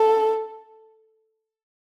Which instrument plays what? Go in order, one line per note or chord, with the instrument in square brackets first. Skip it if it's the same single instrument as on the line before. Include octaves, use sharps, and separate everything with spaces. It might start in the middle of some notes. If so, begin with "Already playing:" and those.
Already playing: [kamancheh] A4